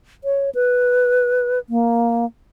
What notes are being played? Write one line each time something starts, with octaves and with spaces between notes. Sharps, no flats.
C#5
B4
A#3